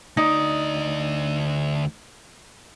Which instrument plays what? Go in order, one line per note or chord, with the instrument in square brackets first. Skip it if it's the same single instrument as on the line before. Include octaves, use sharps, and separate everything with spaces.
[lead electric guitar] D2 D5 [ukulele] D#4